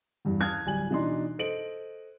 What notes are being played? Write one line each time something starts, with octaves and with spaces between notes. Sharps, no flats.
E2 G2 E3
F5 A5 D#6 F6 F#6 G#6
D1 G3 G#5 F#7
B2 E3 D4 D#4 C6
A4 C5 D#5 D7 F#7